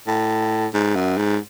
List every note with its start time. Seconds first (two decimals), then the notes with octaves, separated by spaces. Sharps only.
0.07 A2
0.74 G#2
0.95 F#2
1.18 G#2